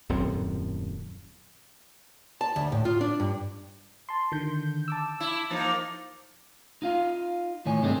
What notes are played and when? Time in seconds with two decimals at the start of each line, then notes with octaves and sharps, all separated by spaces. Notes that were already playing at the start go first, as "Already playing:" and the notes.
0.09 D#1 F#2 A2 C4
2.41 A5
2.56 D2
2.72 A2
2.85 F4
3.01 D4
3.20 G2
4.09 A5 C6
4.32 D3 D#3 G6
4.88 A5 D6 E6
5.20 E4
5.50 F3 A#3 D#4 A6
6.82 D#4 F4 F5
7.66 A2 D#3 C#5 G#5
7.82 G2 C3 D#3 G#3 A3 C4